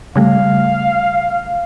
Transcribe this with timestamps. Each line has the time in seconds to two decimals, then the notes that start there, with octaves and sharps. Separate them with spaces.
0.16 C#3 G3 A3 F5